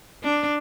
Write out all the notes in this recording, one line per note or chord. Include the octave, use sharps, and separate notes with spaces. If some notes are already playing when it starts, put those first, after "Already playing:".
D4